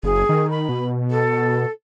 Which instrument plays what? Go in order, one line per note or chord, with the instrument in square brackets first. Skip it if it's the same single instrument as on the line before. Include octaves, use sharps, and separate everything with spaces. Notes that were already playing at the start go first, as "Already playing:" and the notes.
[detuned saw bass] F#1 [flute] G#4
[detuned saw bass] D#3
[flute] B5
[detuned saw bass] B2
[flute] A4